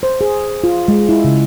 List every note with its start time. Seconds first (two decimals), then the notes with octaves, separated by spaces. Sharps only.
0.03 C5
0.21 G#4
0.64 F4
0.88 G#3
1.09 E4
1.24 C#3